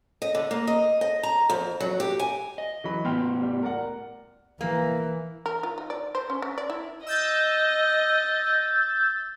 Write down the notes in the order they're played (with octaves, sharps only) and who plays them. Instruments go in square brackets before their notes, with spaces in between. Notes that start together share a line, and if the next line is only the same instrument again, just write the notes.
[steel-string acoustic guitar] D#5
D3
A#3
D#5
D#5
A#5
F2
F#3
G4
G#5
[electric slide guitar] D#5
[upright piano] E3 F#3 B5
[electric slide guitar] A2 B3 [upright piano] G5 C6 F6
[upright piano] G3
A#4 D5 F#5
[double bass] E3 [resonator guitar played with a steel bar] A#3
[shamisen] A#4
F4
D#4
D5
C5
C#4
C#4
D5
E4
[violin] D#5 [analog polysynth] E6 G6 A6